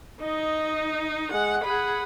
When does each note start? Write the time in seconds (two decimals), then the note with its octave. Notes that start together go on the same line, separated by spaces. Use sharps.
0.22 D#4 D#5
1.32 G#3 F#5
1.64 G#4 F#5 B5